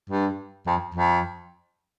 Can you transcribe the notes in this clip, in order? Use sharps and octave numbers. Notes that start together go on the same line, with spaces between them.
G2
F2
F2